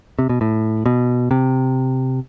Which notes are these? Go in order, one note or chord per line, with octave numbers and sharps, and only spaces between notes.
C3
B2
A2
B2
C3